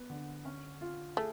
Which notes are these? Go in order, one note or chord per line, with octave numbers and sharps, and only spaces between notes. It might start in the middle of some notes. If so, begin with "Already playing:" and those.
Already playing: B3
D3
C#4
F4
A3 G#4